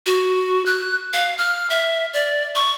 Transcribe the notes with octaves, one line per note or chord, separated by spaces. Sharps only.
F#4
F#6
F5
F6
E5
D5
C#6